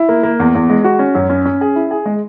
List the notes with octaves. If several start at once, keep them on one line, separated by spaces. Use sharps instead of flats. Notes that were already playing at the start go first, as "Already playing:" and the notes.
Already playing: E4
A#3
A#3
E2
E2
G#3
F#4
C#4
F#2
C#4
C#4
G#4
E4
G#4
G#3